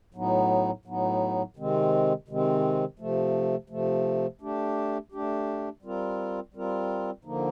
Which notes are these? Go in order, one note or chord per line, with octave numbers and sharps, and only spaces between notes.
A2 F#3 B3 D#4
A2 F#3 B3 D#4
C3 D#3 G#3 C4
C3 D#3 G#3 C4
C3 F3 A3
C3 F3 A3
A3 D4 G4
A3 D4 G4
G3 C4 F4 A#4
G3 C4 F4 A#4
D3 F3 A#3 D#4